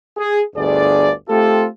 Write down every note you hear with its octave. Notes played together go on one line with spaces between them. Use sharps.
G#4
G1 D2 G2 G#4 D5
A3 C4 F4 G4 A4